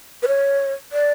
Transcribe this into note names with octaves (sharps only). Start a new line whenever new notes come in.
B4
C#5
D5